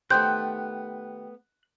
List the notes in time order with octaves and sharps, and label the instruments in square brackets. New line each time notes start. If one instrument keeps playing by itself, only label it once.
[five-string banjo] D#3 G4 [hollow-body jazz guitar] A3 B3 C5 [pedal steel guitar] F#6 [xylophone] G6